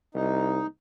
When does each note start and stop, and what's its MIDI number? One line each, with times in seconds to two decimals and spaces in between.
0.15 0.61 36
0.15 0.67 63